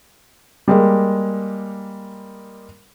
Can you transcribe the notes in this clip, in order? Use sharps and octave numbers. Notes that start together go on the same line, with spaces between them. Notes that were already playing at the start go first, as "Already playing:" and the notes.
G3 G#3 A#3